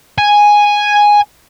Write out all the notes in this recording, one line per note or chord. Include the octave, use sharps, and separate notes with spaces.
G#5